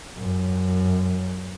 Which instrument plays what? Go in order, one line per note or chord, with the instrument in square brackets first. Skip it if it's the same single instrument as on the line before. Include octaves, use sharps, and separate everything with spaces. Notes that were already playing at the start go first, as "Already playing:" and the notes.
[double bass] F#2